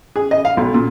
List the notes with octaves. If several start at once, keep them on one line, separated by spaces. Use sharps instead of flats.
G#4
D#5
F5
B1
A#2